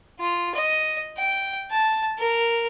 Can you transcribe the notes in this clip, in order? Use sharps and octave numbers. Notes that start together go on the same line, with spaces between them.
F4
D#5
G5
A5
A#4